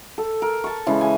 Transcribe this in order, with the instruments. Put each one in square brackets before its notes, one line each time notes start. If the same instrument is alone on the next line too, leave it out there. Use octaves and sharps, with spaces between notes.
[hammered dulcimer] A4
A#4
A5 C#6
C#3 E3 G#3
G#5